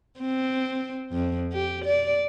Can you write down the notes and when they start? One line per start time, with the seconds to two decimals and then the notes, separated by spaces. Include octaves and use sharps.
0.20 C4
1.12 F2
1.53 G4
1.85 D5